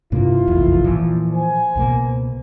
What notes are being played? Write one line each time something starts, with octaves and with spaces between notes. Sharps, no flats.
G2 C3 A#3 E4 F4
F1 A#1 E2
A#2 E3 F3
C5 G#5
C#2 B2 A#3